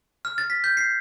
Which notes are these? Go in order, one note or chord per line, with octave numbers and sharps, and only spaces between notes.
F6
A6
B6
G6
C7